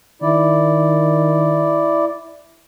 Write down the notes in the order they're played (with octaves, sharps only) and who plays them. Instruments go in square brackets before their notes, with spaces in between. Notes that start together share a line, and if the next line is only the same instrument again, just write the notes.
[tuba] D#3 [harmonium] E4 D5